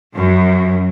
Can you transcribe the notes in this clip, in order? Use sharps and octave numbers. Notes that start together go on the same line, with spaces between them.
F#2